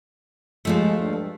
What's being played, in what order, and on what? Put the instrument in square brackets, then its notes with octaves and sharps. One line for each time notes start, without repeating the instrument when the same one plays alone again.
[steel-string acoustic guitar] D#2 F3 A3 [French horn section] G#3
[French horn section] G2